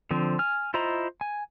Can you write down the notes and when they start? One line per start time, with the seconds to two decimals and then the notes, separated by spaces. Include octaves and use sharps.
0.11 D3 F3 C4
0.39 G#5 F6
0.74 E4 F4 C5 D#5 A#5
1.21 G#5